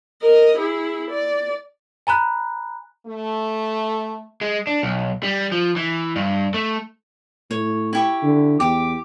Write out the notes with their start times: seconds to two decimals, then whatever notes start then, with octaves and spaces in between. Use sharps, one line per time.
0.22 A#4 D#5
0.57 E4 G#4
1.10 D5
2.07 G#5 A#5 B5 F#6
3.07 A3
4.41 G#3
4.67 D4
4.83 B1
5.23 G3
5.52 F3
5.76 E3
6.16 G2
6.54 A3
7.51 A2 C#5
7.93 E4 G4 C#6
8.23 D3
8.60 E2 G4 D6